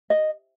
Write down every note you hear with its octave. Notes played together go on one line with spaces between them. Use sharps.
D#5